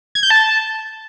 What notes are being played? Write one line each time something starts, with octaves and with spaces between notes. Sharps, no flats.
G#6
G6
A5